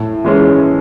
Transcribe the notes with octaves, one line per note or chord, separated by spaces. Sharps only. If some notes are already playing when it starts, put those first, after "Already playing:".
Already playing: A2
E3 G#3 C#4